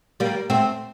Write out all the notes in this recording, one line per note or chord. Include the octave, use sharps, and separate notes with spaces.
G3 A#3
A3 C4